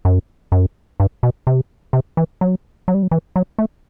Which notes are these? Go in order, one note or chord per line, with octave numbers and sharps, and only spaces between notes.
F#2
F#2
G2
B2
C3
C3
E3
F#3
F#3
G3
F#3
E3
F#3
A3